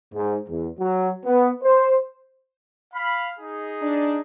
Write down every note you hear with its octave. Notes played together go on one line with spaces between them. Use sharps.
G#2
E2
F#3
B3
C5
F5 B5
D#4 G#4
D4